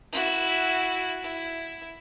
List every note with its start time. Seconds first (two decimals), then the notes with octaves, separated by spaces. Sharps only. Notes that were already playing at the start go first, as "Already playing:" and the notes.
0.12 E4 F#4
1.24 E4